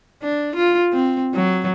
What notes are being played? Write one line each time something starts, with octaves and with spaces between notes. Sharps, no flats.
D4
F4
C4
F#3